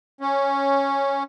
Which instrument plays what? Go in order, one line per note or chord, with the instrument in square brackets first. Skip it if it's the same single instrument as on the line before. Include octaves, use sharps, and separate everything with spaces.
[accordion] C#4